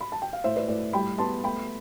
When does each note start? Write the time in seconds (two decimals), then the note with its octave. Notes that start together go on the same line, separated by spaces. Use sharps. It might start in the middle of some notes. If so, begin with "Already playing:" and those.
0.01 B5
0.12 A5
0.22 G5
0.33 F5
0.44 A2 C5 E5
0.56 B4 D5
0.68 A2 B4 D5
0.93 G3 G5 B5
1.18 B3 A5 C6
1.44 A3 G5 B5